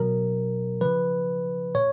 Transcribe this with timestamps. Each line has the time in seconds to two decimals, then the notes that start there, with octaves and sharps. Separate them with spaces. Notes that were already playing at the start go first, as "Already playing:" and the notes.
Already playing: B2 F#3 A#4
0.81 C#3 F3 B4
1.75 A#2 C#5